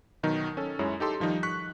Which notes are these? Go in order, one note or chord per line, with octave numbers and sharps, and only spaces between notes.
B2 D#3 F#3 D#4
C#4 A4
F#2 G#3 E4 C#5
D#4 G4 A4 C6
D#3 F3 G3 D#4
C#6 F#6 B6